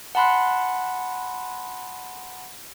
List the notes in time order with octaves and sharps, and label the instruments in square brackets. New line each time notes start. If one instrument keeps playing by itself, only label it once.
[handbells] F#5 A5 B5 C6 F#6